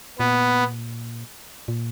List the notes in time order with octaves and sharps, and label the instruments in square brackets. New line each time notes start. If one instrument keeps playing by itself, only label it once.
[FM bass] A#2 [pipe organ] B3
[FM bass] A#2